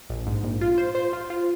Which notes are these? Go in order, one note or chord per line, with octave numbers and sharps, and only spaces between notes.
A#1
G#2
A#1
F4
C5
C5
F4
F4